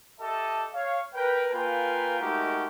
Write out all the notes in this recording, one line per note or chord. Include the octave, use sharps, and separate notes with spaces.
G4 A4 D#5 E5 A5
C#5 F5
A#4 B4 G5
A#3 F4 A#4 B4 G5 G#5
G#3 A3 D#4 F#4 G4 A#4